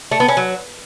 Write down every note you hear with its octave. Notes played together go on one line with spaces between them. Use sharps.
A3
B3
C#4
F#3